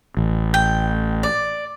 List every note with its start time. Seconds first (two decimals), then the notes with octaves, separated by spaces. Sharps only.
0.17 A1
0.54 G5
1.23 D5